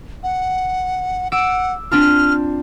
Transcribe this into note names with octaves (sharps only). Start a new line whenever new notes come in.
F#5
F#5 D6 E6 D7
C4 D4 F4 F6